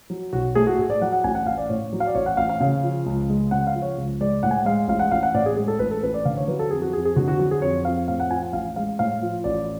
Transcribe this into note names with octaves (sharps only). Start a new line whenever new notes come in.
F#3
B1 F#4
A3 G#4
F#4
A2 G#4
D5
F#3 F#5
F#5
A1 G#5
F#5
A1 F5
D5
A2 C#5
F#3
F5
D5
A1 C#5
F#5
A1 F5
F5
C#3
F3
C#2
G#3
C#3 F#5
F5
F3
C#5
C#2
G#3 D5
A2 F#5
G#5
F#5
G#3 F5
A1 F5
F#5
A1 F5
F#5
A2 D5
G#4
G#3 G#4
A4
A1 B4
A4
A1 B4
D5
D3 F5
C#5
F#3 B4
A4
F2 G#4
F#4
F2 G#4
G#4
D3 F#4
F#4
F#3 F#4
G#4
F2 C#5
F2 F5
A2 F5
F#5
F3 G#5
F#5
A1 F5
G#3 F5
A2 F5
F3
A1 D5